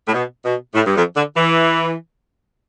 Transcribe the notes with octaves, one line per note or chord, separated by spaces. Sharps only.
A2
B2
B2
A2
G2
F2
D3
E3